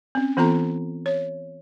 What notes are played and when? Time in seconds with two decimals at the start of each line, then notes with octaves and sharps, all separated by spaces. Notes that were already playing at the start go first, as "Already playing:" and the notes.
0.15 C4 C#4
0.37 E3 B3 C4 F4 A4 A#5
1.06 C#5